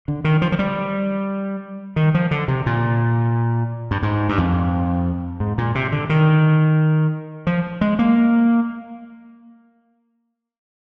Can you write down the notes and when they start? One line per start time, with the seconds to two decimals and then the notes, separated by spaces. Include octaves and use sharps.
0.08 D3
0.24 D#3
0.42 F3
0.52 F3
0.59 G3
1.96 D#3
2.14 F3
2.31 D3
2.48 C3
2.66 A#2
3.91 G2
4.03 G#2
4.29 G2
4.38 F2
5.40 G#2
5.58 A#2
5.75 C3
5.92 D3
6.09 D#3
7.47 F3
7.81 G#3
7.99 A#3